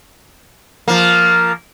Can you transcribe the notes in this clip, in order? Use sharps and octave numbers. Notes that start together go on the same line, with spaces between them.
F3 A#3